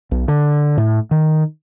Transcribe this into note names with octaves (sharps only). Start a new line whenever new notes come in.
B1
D3
A2
D#3